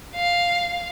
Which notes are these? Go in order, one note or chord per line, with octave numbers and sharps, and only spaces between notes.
F5